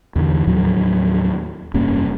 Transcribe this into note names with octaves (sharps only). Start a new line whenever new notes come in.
E2 D3 E3
D#2 A2 F3 F#3
F1 G2 A#3 C#4